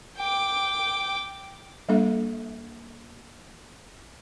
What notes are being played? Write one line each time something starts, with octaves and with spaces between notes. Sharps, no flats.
G5 D6
G3 A#3 D4 A4 E5